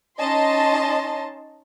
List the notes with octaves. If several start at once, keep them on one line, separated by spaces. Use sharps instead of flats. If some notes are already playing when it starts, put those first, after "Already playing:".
C#4 D#4 D#5 A5 C6